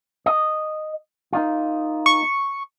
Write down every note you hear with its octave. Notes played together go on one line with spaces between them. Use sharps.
D#5
A#3 D#4 F4
C#6